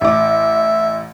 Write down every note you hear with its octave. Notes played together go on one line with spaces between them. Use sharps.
A1 E5 D6